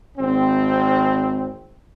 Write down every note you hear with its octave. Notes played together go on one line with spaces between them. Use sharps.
G#1 C4